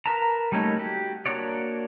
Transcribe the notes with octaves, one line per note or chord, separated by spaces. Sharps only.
A#4 B4 A5 A#5
G3 A3 A#3 C#4 D#4
F#4 G4
A#3 D4 F#4 C#5 D5